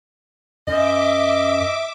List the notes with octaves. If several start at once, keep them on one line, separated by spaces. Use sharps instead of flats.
F#2 D#5 E5 D6